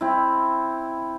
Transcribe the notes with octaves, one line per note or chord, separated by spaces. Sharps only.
C4 E4